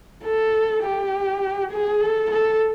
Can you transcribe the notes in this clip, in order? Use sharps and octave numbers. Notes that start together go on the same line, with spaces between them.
A4
G4
G#4
A4
A4